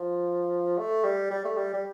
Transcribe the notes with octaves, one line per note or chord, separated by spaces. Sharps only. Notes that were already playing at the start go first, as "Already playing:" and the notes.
Already playing: F3
A3
G3
G3
A3
G3
G3